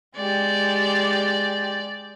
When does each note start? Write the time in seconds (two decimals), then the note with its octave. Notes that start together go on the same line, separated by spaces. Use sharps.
0.16 G#3 G4 D5